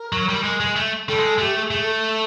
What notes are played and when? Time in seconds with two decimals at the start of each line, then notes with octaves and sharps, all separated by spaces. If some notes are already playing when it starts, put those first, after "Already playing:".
Already playing: A#4
0.13 F#3
0.29 G3
0.44 G#3
0.60 G#3
0.76 A3
1.07 G3 A4
1.18 G#3
1.39 A3 G4
1.55 A4
1.60 G#4
1.71 A3
1.81 A4